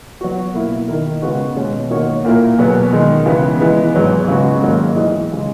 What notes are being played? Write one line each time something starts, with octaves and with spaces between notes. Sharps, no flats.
F#3 B3 F#4
B2 A#3 E4
D#3 A#3 E4 A#4
C#3 G#3 B3 F#4
B2 G#3 C#4
D#3 A#3 D#4 F#4 C#5
A#2 A#3 E4 A#4
E2 B2 F#3 B3
D#3 G#3 D#4
C#3 E3 B3 E4
E3 G#3 B3
G#2 F#3 B3
C#3 G#3 B3 F#4
G#2 D#3 F#3 A#3
E3 B3 D#4 G#4 D#5
C#3 G#3